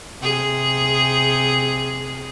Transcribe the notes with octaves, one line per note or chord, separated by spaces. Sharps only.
C3 G#4